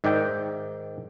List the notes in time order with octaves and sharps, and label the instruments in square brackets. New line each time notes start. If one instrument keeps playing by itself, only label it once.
[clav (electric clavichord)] G#2 D#3 D5 E5 G5